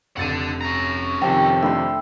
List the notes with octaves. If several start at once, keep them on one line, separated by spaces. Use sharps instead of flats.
F1 D4 F#5 A6 D#7
C#4 A#5
F2 C3 D#3 G5
A3 D4 E4 C6